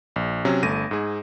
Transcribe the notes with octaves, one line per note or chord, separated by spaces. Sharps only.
A#1
C3 F#3 C#4
G1 A3 A#6 D#7
G#2 G#4